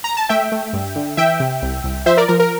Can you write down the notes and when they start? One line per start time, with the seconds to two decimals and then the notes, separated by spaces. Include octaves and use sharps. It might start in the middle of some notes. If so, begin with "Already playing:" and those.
0.04 A#5
0.17 A5
0.29 A3 E5 G5
0.52 A3
0.73 G2
0.96 D3
1.17 E3 E5 G5
1.40 C3
1.62 C2
1.84 C2
2.06 F3 C5 E5
2.17 A#4 D5
2.28 F3 A#4
2.40 A#4